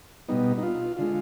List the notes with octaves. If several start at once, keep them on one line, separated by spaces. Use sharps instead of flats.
B2 G3 B3 D#4
D#4
F4
D3 G#3 F4